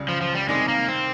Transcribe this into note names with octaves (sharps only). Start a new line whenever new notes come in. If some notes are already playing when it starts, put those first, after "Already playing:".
Already playing: C#2 C#3 G3
F3
F3
G3
C3 D#3 G3 G#3
A#3
C4